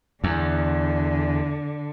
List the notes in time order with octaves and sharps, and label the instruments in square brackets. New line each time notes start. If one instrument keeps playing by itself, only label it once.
[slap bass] E2 [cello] D3